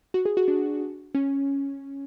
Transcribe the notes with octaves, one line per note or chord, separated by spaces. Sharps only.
F#4
G#4
F#4
D4
C#4